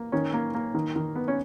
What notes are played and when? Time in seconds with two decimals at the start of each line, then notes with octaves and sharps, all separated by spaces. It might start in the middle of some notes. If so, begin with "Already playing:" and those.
Already playing: A#3
0.12 D#3 C#4
0.33 A#3
0.55 A#3
0.75 D#3
0.96 D#3
1.15 B3
1.28 C#4